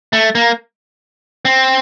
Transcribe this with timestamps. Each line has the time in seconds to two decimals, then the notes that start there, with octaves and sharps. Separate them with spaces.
0.13 A3
0.35 A#3
1.45 C4